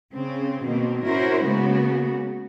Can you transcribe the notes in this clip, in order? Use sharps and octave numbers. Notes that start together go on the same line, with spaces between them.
C#3 C4
B2 D#3 A#3 C4
C#4 E4 F#4 A#4 C5
C#3 G#3 A#3 B3 F#4